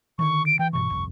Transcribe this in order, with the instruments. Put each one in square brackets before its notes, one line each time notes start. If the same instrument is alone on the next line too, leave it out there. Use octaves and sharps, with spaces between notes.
[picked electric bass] D3 D#3 F3 [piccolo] C#6
[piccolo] D7
[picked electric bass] E3 [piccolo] G5
[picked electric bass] G2 B2 E3 [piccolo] C#6
[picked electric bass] G1 C2 F2